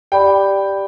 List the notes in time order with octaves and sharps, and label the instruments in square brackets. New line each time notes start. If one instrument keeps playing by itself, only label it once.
[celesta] G4 D5 B5 D6 [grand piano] G5